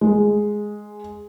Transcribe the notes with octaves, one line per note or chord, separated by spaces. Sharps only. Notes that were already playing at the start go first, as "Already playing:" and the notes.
G#3